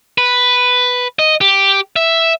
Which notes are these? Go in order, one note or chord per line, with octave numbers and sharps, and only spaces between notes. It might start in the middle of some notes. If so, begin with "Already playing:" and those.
B4
D#5
G4
E5